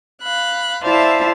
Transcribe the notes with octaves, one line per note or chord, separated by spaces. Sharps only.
F5 B5 F#6
E4 C5 D5 E5 F5 A5